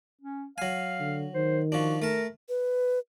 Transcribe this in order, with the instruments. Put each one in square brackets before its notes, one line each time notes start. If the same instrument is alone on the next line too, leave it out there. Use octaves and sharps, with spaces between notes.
[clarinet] C#4
[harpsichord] F#3 G#5 [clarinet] F5
[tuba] D3
[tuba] D#3 [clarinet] C5
[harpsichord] F3 D4 [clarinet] F#4
[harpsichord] A3 A5 [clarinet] A#4
[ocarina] B4